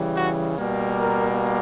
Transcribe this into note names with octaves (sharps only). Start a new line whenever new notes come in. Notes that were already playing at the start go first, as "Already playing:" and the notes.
Already playing: C#3 E3 G3
F#4
B2 G3 A#3
A#4